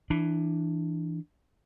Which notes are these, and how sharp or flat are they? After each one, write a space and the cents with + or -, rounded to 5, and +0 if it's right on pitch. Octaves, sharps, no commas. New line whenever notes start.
E3 +0 D4 +15